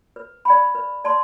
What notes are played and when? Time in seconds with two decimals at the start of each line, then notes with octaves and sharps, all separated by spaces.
0.16 B4
0.45 D5 G5 B5
0.75 B4
1.04 D5 A5 C6